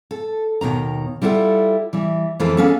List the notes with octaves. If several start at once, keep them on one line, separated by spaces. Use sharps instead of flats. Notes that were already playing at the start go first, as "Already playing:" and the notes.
A4
D#2 B2 D#3 A#5
G3 E4 F4 A4 F#5
E3 G3 E5
F2 E3 A#3 F4 A4 B4
A#3 B3 C#4 G#4 A4